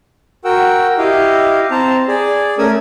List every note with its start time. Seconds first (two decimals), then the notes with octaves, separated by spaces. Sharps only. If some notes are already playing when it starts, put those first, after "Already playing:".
0.45 F#4 A#4 F#5 G5 E6
0.98 E4 G4 D#5 F5
1.71 C4 C5 A5 A#5
2.08 G#4 D5
2.58 A3 C#4 A#4 G#5 D#6 E6